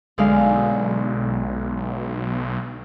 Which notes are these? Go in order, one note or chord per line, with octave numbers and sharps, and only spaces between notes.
B1 D3 G#3 F5